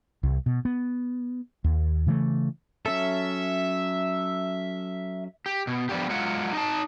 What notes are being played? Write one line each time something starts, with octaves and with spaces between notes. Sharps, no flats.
C2
B2
B3
D#2
C#3 E3 F#3 A3
F#3 C#4 A4 E5
G4
B2
F3 G3 B3 D4 G4
F#3 G#3 F4 F#5
D#4 D#5 A5